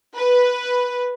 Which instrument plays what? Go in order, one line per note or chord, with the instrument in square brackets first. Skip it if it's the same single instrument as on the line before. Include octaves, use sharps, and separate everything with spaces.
[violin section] B4